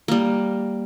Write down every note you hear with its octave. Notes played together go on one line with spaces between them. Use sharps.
G3 A#3